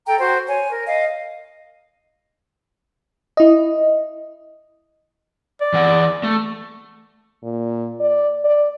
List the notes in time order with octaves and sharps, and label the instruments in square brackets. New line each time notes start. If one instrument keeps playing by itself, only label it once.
[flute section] A4 G5 A#5
F#4 C5
C#5 G#5
A#4
D#5 F5
[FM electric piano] E4 D#5
[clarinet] D5
[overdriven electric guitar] E3 F#5
A3
[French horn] A#2
D5
D5